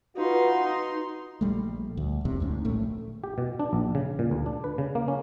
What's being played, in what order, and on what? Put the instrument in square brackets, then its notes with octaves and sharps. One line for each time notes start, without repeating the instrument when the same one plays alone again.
[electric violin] D#4 C6 [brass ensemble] F4 F#4 B4
[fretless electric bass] A#1 G3 A3
D2
E1 B1 E2 C3
D2 G#2 C#4
A#1 A2 A3
[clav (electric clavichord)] G4
B2
D4
A#1
C#3
A#2
D2
D4
B4
C#3
A#3
C#4